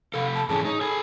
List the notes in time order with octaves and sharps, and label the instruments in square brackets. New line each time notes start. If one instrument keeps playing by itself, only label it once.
[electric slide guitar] C3 A4 [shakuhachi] F5 [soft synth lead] B5
[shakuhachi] A5
[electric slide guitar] G#2 E3 C#4 [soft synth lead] G#4 [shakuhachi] A5
[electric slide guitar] D#4 [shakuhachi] C#5
[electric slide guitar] A4 G#5 [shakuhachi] B5